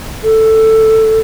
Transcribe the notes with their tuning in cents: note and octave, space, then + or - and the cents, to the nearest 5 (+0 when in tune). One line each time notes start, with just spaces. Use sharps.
A4 +5